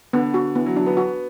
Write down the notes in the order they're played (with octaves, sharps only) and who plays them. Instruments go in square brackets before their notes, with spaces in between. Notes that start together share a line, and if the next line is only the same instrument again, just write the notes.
[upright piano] D3 [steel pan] B3
[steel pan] F#4
[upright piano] E3 [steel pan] B3
[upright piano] F#3
[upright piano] F#3 [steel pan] D4
[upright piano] B3
[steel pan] F#4